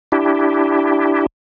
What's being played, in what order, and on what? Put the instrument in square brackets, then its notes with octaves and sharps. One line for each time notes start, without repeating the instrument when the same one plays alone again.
[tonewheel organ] D4 E4 G4